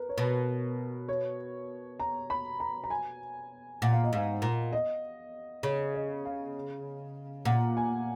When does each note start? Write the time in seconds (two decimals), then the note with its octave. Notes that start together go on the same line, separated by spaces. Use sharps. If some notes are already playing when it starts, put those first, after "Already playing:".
Already playing: A#4 B4
0.09 C#5
0.17 B2 B4
1.08 C#5
2.00 A#5
2.30 B5
2.60 A#5
2.84 A#5
2.90 G#5
3.82 A#2 F#5
3.93 F5
4.04 D#5
4.13 G#2 F5
4.42 A#2
4.73 D#5
5.63 C#3 C#5
5.94 D#5
6.25 F5
7.45 A#2 F#5
7.77 G#5